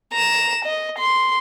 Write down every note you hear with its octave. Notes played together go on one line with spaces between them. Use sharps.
A#5 E7
D#5
C6